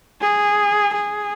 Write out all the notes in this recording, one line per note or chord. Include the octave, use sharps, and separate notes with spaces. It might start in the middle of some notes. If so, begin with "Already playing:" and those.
G#4
G#4